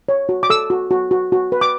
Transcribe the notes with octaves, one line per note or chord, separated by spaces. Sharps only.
C#5
F#4
D6
A4 E6
F#4
F#4
F#4
F#4
B4
D6